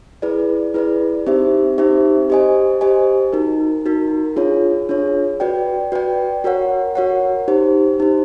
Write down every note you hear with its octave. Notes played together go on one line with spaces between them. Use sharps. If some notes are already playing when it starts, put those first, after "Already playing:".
E4 G#4 B4 D5
E4 G#4 B4 D5
C4 D#4 G4 C5 E5
C4 D#4 G4 C5 E5
G4 C5 D#5 G#5
G4 C5 D#5 G#5
D#4 F#4 A#4
D#4 F#4 A#4
D4 F4 G#4 C#5
D4 F4 G#4 C#5
F#4 B4 D5 G5
F#4 B4 D5 G5
F#4 A#4 C#5 F#5
F#4 A#4 C#5 F#5
D#4 G4 C5
D#4 G4 C5